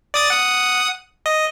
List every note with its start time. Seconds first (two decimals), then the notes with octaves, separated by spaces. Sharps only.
0.14 D5 D#6 A6
0.30 F#5 D#6
1.26 D#5